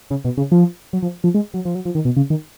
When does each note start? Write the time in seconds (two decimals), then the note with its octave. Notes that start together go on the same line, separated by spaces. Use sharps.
0.10 C#3
0.25 B2
0.37 C#3
0.52 F3
0.93 F#3
1.02 F3
1.24 F3
1.34 G#3
1.54 F#3
1.65 F3
1.75 F#3
1.85 F3
1.95 D#3
2.05 B2
2.17 C#3
2.30 D#3